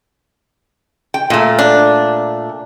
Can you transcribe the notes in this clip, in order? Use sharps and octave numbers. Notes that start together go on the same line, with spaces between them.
G5
A#2 A3
D4